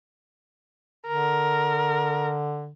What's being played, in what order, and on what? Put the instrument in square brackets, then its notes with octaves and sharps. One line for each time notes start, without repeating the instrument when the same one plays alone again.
[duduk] D3 [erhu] A#4